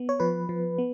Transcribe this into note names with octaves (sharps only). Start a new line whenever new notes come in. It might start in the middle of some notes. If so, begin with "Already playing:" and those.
Already playing: B3
C#5
F3 B4
F3
B3